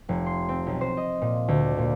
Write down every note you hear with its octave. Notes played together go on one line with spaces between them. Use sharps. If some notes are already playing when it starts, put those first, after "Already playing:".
F1
C6
C4
B1
C5
D#5
A#2
D2
A#2